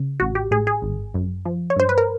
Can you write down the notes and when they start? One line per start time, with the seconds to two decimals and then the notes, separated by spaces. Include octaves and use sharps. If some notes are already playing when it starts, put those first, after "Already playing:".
Already playing: C#3
0.20 A1 F#4
0.35 G4
0.51 A2 G#4
0.67 G#4
0.82 G#1
1.14 F#2
1.45 F3
1.70 C#5
1.76 G2 C5
1.89 B4
1.98 A#4